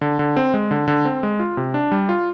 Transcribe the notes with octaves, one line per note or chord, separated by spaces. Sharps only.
D3
D3
C4
G#3
D3
D3
C4
G#3
F4
C3
D4
G3
F4